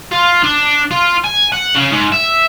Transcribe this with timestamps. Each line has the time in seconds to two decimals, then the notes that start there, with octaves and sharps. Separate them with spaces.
0.11 F4
0.44 D4
0.91 F4
1.24 G#5
1.52 F#5
1.75 C#3
1.92 G#2
2.12 E5